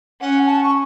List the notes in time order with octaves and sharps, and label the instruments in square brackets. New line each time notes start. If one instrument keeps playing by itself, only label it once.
[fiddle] C#4 [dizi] F#5
[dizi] A5
C#6